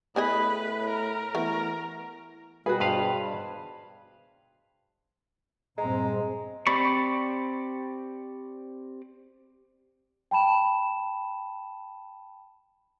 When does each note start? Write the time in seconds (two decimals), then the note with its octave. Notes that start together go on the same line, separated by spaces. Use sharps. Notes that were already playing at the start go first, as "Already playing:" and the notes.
0.16 A2 B3 G#4 B4 D#5
0.89 A#4
1.35 E3 A3 B3 A#4
2.66 B2 G3 F#4 G#4 B4
2.80 G2 B4 C5 F5
5.78 A#1 G2 G#3 C4 A#5
6.67 C4 G4 D5 B5 C#6
10.31 G5 A5 B5 E7